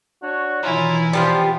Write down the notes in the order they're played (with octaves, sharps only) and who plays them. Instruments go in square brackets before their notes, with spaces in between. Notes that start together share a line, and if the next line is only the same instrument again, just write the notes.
[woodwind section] D4 F#4 C#5
[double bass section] B2 D#3 E3 [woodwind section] F#3 F4 A#5 [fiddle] E4 G#5
[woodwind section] F3 [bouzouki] G3 B3 F4